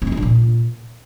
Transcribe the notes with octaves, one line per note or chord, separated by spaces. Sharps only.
C#4
D#4
E4
D4
A#2